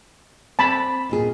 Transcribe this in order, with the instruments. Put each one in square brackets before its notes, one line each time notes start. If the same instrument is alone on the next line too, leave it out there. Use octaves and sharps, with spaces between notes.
[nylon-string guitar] C4 [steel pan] A5 B5
[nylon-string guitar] D#2 A#2 G#4